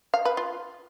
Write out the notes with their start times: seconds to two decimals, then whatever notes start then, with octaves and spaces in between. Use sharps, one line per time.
0.14 F5
0.25 B4
0.37 F4